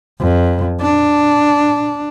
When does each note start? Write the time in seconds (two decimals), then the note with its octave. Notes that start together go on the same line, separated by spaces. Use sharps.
0.20 F2
0.81 D4